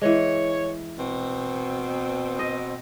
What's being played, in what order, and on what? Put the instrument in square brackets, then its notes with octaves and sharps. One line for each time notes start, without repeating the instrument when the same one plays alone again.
[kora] E3 G#3 [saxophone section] C#5
[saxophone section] B2 C4
[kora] D#5